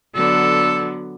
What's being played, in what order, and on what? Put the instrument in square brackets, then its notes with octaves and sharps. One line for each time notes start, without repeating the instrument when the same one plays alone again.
[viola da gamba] D3 F#3 B3 [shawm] A4